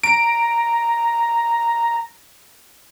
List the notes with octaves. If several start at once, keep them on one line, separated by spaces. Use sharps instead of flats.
A#5 D7